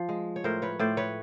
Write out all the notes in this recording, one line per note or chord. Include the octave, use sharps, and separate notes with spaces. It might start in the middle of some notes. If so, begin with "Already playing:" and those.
Already playing: F3
G#3
C#5
A2 A#4 C5
B4 C#5
A2 C5 D5
B4 C#5